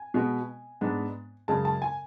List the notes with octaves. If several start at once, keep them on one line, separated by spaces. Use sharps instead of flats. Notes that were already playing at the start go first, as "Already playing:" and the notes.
Already playing: G#5
B2 G#3 B3
G#2 G#3 B3 D4
F#2 C#3 G#3 A5
A5
G#5